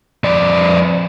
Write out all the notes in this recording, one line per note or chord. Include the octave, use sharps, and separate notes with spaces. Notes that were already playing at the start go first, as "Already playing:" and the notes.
F2 D5